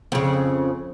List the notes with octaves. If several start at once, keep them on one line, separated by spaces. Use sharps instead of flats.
F2 C#3